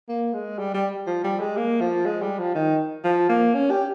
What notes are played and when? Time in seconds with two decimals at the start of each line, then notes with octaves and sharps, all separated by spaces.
0.09 A#3
0.33 G#3
0.59 G3
0.74 G3
1.07 F3
1.24 G3
1.40 G#3
1.57 A#3
1.81 F3
2.06 G#3
2.22 G3
2.39 F3
2.55 D#3
3.04 F3
3.29 A#3
3.54 C#4
3.71 G4